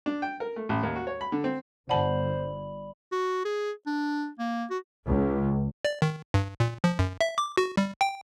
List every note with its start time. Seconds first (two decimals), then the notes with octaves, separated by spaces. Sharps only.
0.06 D4
0.22 G5
0.40 A#4
0.56 A3
0.69 A1
0.83 D#2
0.96 F#4
1.07 C#5
1.21 B5
1.32 D3
1.44 C4
1.89 G1 D3 C5 D5 F#5 A5 B5 F#7
3.12 F#4
3.45 G#4
3.87 D4
4.39 A#3
4.70 F#4
5.07 C#2
5.85 D5
6.02 D#3
6.34 G2
6.60 A#2
6.84 F3
6.99 F#2
7.21 E5
7.38 D6
7.57 F#4
7.77 G3
8.01 G5